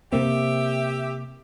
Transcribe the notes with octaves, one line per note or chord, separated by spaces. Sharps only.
C3 A#3 C4 G4 E5